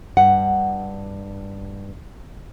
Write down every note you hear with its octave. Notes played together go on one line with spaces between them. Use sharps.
G2 F#5